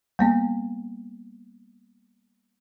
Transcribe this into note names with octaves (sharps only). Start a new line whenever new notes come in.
G3 A#3 B3